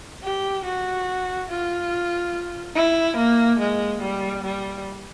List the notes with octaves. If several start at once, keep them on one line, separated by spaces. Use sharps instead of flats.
G4
F#4
F4
E4
A#3
G#3
G3
G3